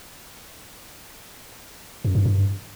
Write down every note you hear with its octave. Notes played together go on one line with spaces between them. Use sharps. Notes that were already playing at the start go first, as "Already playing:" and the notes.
F#2
G2
G2